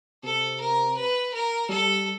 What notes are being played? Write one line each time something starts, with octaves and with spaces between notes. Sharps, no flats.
C3 A4
A#4
B4
A#4
G3 A4